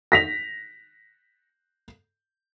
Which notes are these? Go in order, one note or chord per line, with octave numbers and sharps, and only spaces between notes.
A#6 B6 F7